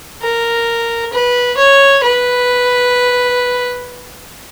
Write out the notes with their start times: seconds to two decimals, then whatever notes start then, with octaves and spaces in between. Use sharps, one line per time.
0.22 A#4
1.13 B4
1.58 C#5
2.03 B4